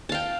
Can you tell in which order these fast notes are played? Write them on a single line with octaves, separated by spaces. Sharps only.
A5 F5 G5